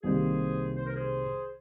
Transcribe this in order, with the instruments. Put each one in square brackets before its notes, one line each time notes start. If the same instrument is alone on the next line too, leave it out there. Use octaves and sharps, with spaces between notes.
[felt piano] C2 C3 D#3 G3 A#3 [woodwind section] G#4 C5
[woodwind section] C5
A#4
G#4 C5